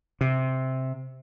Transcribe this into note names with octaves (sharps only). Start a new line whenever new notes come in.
C3